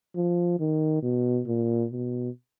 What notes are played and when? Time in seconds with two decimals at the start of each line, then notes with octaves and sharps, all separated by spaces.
0.16 F3
0.60 D#3
1.03 B2
1.46 A#2
1.90 B2